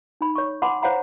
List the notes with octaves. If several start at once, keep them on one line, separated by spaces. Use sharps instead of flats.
D#4 B5
C#5 C#6
F#5 G#5 A5 B5 C6 D6
C5 C#5 F5 F#5 A#5 B5